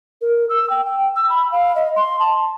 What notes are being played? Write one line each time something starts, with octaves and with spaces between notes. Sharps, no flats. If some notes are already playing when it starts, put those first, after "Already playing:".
A#4
E6
G5
G5
E6
B5
F5
D#5
C6
A5